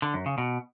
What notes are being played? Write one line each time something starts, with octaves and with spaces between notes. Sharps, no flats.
D3
F#2
C#3
B2